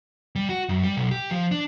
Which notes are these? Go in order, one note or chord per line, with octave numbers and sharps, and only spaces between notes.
G3
F#4
F#2
G3
B1
G4
F3
D4